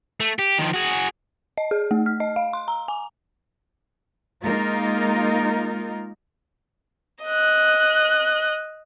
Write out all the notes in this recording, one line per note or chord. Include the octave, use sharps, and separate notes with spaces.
A3
G4
D#3 F3
F#4 G#4
D#5
G#4
A3
F6
D#5
F5
C6
A#5
G#5
G#3 A#3 D#4 F4 A#4
D#5 F#6